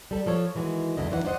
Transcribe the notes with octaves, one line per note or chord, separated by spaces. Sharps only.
G3 A4
F3 A4 C#5
D#3 E3 G#3 F#4
E2 G2 D3 E4 D#5
D#3 E3 C5 F#5
D4 D#4 C5 D#5 F#5